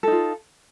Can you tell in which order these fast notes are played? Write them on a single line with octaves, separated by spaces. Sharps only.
A4 D#4 F4